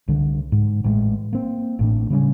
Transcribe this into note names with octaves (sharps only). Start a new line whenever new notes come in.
C2 D3
G#2
A1 A2 G#3
A#3 C4
A1 A2 D4
C#3 G3 C4 C#4